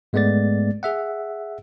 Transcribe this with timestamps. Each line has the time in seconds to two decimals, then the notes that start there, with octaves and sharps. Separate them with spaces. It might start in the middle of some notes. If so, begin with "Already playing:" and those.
0.13 G#2 G#3 A3 B3 D5 A6
0.83 G#4 E5 F#5